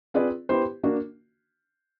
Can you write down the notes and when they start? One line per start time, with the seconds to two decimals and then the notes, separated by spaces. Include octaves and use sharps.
0.14 C4 F4 G#4 B4 D5
0.49 B3 E4 G4 C5
0.83 A#3 D4 F#4